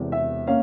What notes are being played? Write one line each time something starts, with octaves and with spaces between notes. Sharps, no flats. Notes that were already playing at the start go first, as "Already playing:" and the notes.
Already playing: E1 E2 C3
E5
A#3 C#4 F5